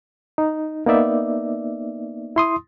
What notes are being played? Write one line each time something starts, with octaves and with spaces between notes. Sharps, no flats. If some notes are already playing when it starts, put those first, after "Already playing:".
D#4
A#3 B3 D#4 D5 E5
E4 C6 D#6